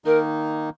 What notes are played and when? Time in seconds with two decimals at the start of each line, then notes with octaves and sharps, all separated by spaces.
0.05 D#3 A#3 D#4 A#4